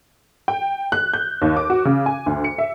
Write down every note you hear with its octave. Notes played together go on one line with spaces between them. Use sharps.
G5
F#6
G6
D#2
D6
F#4
C#3
G#5
D2
C#7
E5